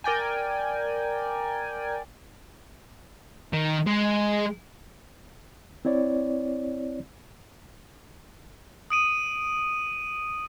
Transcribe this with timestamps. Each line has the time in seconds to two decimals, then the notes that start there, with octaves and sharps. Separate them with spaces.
0.04 A#4 D5 G5 G#5
3.53 D#3
3.86 G#3
5.85 C4 E4 C#5 D5
8.90 D#6 D7 D#7